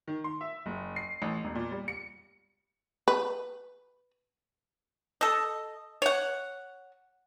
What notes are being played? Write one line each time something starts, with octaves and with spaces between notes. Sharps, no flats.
D#3
C6
E5
F#1
C7
A1
E1
A#2
G3
C#7
B4
A4 D#5
C#5 F#5